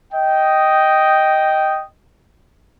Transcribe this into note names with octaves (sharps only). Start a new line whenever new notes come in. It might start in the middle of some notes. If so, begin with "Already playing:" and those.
D#5 G5